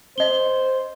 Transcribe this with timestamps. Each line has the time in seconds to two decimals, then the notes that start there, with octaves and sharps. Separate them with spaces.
0.18 C5 D#5 G7